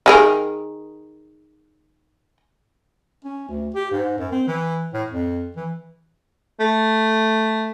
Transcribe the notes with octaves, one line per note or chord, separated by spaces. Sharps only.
D#3 G#4 A#4
C#4
D2
G4
G#2
F#2
C4
E3
A2
F2
E3
A3